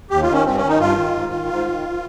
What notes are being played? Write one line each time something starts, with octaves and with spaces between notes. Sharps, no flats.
D#2 G4
D#3 F4
C#4
G2 C4
C#4
D#3 D#4
G2 F4
D#3
G#2
D#3
G#2
D#3